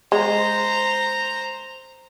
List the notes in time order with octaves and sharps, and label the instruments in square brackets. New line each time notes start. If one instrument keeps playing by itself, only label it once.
[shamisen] G#3 [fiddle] C5 A#5